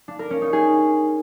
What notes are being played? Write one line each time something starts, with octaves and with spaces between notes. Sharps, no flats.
D4
A#4
C#4
D#4
G#4